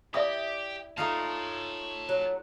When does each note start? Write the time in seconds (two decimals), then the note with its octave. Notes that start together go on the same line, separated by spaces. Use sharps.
0.14 E4 G4 D5 E5 D#6
0.98 A3 D#4 F4 C#5 A5
2.09 F#3